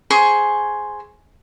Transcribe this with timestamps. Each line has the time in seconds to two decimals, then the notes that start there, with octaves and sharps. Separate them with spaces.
0.10 G#4 C5 G#5 C#6